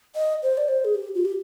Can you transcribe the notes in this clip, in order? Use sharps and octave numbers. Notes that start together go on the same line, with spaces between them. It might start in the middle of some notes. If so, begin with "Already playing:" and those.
D#5
C5
D5
C5
G#4
G4
F4
G4